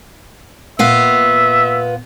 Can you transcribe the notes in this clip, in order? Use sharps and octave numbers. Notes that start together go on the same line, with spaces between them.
A#2 B3 E5 F5